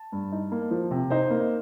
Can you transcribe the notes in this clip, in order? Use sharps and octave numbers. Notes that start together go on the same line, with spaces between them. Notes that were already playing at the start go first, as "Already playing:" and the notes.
Already playing: A5
G2
D#4
A#3
F3
C3
D#4 C5
A#3